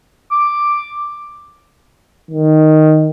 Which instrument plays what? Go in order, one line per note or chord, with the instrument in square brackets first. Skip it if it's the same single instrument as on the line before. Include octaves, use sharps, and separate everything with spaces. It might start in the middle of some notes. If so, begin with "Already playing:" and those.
[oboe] D6
[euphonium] D#3